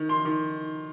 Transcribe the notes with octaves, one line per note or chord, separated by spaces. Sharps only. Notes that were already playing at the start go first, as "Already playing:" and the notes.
Already playing: D#3
C6
D#3